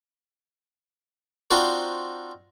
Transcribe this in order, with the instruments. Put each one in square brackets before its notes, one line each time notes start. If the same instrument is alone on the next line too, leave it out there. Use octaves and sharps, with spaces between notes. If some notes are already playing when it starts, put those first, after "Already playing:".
[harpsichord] C4 D4 D#4 F4 F#4 C5